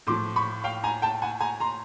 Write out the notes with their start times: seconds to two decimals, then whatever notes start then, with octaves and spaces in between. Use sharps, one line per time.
0.07 A2 F3 A3 C6 D6
0.36 B5 C#6
0.64 F5 G5
0.84 G#5 A#5
1.02 G5 A5
1.22 F#5 G#5
1.40 G#5 A#5
1.60 A#5 C6